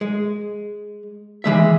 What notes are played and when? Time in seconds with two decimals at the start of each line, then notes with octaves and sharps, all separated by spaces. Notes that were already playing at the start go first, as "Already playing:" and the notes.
0.01 G#3
1.44 E3 F3 G#3 E5